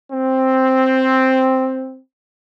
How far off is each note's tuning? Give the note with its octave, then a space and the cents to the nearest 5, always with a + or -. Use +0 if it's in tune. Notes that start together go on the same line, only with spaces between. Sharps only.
C4 +0